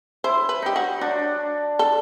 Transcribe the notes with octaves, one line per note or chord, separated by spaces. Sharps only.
E4 C5
B4
D#4 G4
F#4
D4 F#4
A4